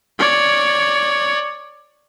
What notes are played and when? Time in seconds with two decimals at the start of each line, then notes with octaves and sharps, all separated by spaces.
0.19 C#5 D5